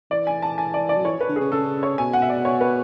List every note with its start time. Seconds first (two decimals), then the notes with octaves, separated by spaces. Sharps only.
0.11 E3 D5
0.27 G#5
0.42 A5
0.58 G#5
0.74 D5
0.89 D5
0.97 F#3
1.05 E3 C#5
1.21 B4
1.29 D3
1.36 C#3 G#4
1.52 C#3 A4
1.83 C#5
1.98 B2 G#5
2.13 F#5
2.22 E5
2.30 D5
2.45 C#5
2.61 B4